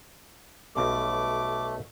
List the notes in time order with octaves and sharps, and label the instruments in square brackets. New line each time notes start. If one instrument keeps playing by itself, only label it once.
[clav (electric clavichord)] B1 B2 G3 [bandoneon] A3 [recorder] D6